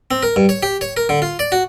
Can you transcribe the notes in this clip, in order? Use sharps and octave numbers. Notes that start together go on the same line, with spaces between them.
C4
A#4
G2
C#5
G4
C#5
A#4
D3
F4
D5
F#4